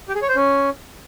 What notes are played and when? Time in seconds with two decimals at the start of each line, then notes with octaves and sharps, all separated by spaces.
0.08 G4
0.15 G#4
0.22 C#5
0.29 C5
0.36 C#4